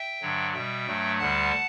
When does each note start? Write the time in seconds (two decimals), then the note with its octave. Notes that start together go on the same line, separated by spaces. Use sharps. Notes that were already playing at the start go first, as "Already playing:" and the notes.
Already playing: E5 G5
0.21 G2 D3 F#3
0.54 B2 G3 E5 G5
0.87 G2 F#3 A3
1.19 D2 D3 G3 F#5 A5